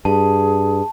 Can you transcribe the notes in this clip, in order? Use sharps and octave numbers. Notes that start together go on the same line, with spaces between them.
G2 G#4 A5